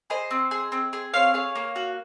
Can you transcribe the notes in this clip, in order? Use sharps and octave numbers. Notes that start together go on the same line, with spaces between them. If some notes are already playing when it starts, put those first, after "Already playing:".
G#4 C5 D#5
C4
G#4
C4
G#4
C4 C#5 F5
G#4 C#5 F5
A#3
F#4